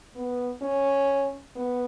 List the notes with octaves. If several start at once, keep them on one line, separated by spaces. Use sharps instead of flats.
B3
C#4
B3